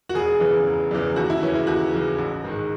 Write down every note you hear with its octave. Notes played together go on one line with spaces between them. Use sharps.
F#4
E1 G#4
E2 C#3 E3
E1
E2 C#3 E3
D#2 F#4
E4
C#3 E3 C#4
E4
D#2 F#4
C#3 E3
A1
G#2 D#3